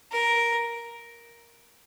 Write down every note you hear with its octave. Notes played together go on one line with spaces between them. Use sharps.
A#4